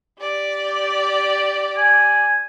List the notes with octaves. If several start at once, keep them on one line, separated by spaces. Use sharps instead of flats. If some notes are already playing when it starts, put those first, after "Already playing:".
G4 D5
G#5